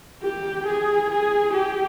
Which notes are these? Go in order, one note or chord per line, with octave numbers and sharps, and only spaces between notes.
G4
G#4
G#4
G4